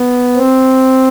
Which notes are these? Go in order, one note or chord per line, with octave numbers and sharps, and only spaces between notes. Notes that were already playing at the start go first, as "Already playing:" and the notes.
Already playing: B3
C4